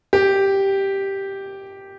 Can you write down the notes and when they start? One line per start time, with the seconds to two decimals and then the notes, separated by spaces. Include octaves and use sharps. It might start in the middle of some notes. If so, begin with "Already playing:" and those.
0.13 G4